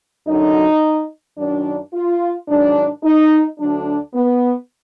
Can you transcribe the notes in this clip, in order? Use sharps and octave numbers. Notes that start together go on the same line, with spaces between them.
F#2 D3 F#3 D#4
F#2 D#3 F#3 D4
F4
G#2 D#3 F#3 D4
D#4
D2 D3 F#3 D4
B3